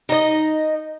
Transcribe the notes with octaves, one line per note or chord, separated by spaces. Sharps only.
D#4 D#5